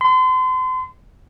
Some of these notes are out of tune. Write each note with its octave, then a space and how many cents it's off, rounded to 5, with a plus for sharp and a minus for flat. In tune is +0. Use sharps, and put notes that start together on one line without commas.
C6 -35